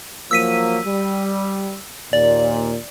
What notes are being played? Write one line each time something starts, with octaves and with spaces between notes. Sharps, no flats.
F3 F#3 A#3 E6 B6 D#7
G3
D#2 A#2 D5